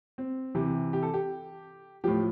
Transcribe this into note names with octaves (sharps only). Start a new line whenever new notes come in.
C4
C3 E3 G4
G4
A4
G4
A2 F3 G4